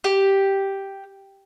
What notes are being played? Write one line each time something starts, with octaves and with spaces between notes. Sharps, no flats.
G4